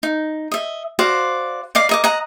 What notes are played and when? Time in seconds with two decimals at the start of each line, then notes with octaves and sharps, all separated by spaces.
0.03 D#4
0.51 D#5 E5
0.99 F#4 C5 D5 F5
1.75 D5 D#5 F5 D6
1.89 A#4 D#5 D6
2.04 D#5 F#5 A#5